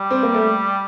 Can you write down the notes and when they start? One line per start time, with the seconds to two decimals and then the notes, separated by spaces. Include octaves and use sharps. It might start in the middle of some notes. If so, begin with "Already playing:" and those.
Already playing: G3
0.11 C4
0.23 A#3
0.34 A3